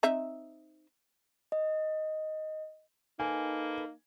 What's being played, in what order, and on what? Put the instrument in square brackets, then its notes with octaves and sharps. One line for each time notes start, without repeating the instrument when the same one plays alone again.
[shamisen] C4 D#4 E5
[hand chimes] D#5
[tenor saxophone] A#3 [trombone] D#4 [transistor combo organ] A4 B4 [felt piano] G#5